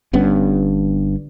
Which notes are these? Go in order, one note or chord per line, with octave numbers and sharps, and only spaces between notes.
G1 G2 B3 C#4